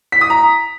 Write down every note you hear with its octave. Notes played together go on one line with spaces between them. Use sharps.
B6
D#6
A#5